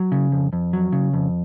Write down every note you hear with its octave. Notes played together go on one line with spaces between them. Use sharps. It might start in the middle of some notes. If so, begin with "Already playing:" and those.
Already playing: F#3
C#3
F2
F2
F#3
C#3
F2